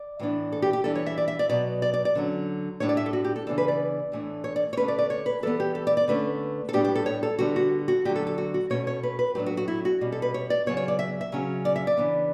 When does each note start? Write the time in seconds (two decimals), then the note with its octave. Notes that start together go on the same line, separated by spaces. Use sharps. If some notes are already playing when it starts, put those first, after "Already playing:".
Already playing: D5
0.19 A2 E3 B3 D4
0.52 A4
0.62 G4
0.73 G4
0.84 E3 G3 D4 A4
0.96 C#5
1.06 E5
1.18 D5
1.28 E5
1.39 D5
1.50 B2 F#3 B3 D5
1.82 D5
1.94 D5
2.05 D5
2.15 D3 F#3 C#4
2.80 A2 G3 D4 C#5
2.89 D5
2.97 E5
3.06 A4
3.13 F#4
3.25 G4
3.36 A4
3.47 C#3 E3 B3 D4 A4
3.58 B4
3.68 D5
4.12 A2 E3 A3 D4
4.44 C#5
4.56 D5
4.73 C#5
4.77 D3 A3 C#4 B4
4.88 D5
4.99 D5
5.10 C#5
5.26 B4
5.43 E3 G3 B3 A4
5.60 G4
5.75 A4
5.87 D5
5.97 D5
6.08 D3 A3 C#4 B4
6.69 A4
6.73 A2 G3 B3 D4 G4
6.85 G4
6.95 A4
7.06 C#5
7.23 A4
7.39 D3 G3 B3 F#4
7.56 F#4
7.88 F#4
8.05 D3 F#3 A3 G4
8.16 A4
8.27 A4
8.38 F#4
8.54 F#4
8.70 B2 A3 C#4 C#5
8.87 C#5
9.03 B4
9.19 B4
9.35 A2 F#3 A3 D4 G4
9.46 F#4
9.57 F#4
9.68 E4
9.85 F#4
10.01 B2 G3 C#4
10.12 A4
10.22 B4
10.34 C#5
10.50 D5
10.66 C#3 F#3 B3 C#5
10.77 C#5
10.88 D5
10.99 E5
11.21 E5
11.32 C#3 F#3 C#4
11.65 D5
11.76 E5
11.87 D5
11.97 C#3 E3 B3 D4